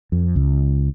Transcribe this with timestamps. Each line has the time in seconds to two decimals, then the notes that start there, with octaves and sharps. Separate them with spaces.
0.12 F2
0.36 C#2